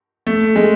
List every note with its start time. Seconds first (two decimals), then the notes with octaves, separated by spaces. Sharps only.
0.27 A3
0.56 G#3